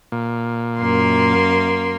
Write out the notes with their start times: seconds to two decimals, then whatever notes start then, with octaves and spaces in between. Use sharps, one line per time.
0.12 A#2
0.80 F#2 A#3 C6